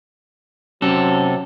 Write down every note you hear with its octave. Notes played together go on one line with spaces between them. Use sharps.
C3 F#3 C#4 A4